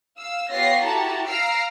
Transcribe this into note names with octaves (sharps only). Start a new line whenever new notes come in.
F5 E6
B3 F4 G4 C#5 A#6 C7
E4 F#4 G4 A4 A5 A#5
F5 A#5 E6 F6 C7 D7